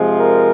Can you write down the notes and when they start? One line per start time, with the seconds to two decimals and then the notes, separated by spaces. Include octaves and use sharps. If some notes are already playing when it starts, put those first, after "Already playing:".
Already playing: C3 F3 G#3
0.19 A#4